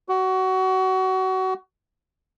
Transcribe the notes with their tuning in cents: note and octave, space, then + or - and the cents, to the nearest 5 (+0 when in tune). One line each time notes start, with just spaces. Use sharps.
F#4 +25